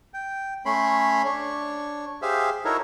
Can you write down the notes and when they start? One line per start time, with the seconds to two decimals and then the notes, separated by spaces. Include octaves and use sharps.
0.14 G5
0.66 A3 C#4 C#5 B5 C6
1.25 D4 C#5
2.22 G4 G#4 C5 E5 F5
2.65 D#4 E4 F#4 A4 A#4 C#5